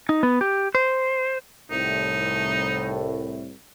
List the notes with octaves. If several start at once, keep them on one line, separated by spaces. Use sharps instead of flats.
D#4
B3
G4
C5
C2 A2 D#4